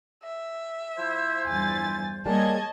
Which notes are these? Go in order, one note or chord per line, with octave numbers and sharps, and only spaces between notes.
E5
F3 E4 C5
E2 G2 G#5 A6
G3 G#3 A#3 C#5 D#5 A5 G#6